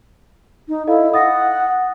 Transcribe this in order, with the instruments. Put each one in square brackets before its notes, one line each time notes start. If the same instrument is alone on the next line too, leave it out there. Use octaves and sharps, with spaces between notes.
[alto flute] D#4
[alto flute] E4 [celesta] A4 D#5 F5
[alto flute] F#5 [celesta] D#6 A6 A#6